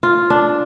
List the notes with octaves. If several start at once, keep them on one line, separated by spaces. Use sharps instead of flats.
F4
D4